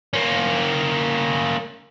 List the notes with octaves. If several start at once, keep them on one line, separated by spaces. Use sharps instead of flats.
A#3 C#4